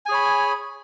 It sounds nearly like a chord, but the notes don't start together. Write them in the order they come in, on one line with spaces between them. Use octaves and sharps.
G#5 G#4 C#5 B5